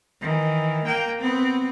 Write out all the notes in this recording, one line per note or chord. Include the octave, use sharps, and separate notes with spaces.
D#3 E3
A#3 G5
B3 C4